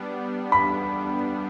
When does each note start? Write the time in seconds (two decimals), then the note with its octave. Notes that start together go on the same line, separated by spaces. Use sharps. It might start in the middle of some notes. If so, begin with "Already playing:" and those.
Already playing: G3 B3 D4
0.52 B5